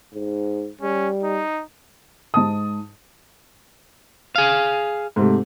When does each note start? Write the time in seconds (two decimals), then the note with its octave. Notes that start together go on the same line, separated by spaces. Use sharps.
0.14 G#2
0.81 G3 C#4
1.23 D#4
2.34 G#2 A5 D#6
4.36 G#4 F5
5.16 G#2 C3 A3